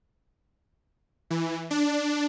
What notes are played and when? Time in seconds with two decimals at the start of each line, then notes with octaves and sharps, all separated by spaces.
1.30 E3
1.71 D4